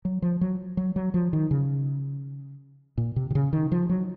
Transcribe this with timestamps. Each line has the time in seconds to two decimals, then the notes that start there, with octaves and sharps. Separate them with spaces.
0.05 F#3
0.22 F3
0.41 F#3
0.77 F#3
0.96 F#3
1.14 F3
1.33 D#3
1.51 C#3
2.98 A#2
3.16 C3
3.30 C3
3.35 C#3
3.53 D#3
3.72 F3
3.89 F#3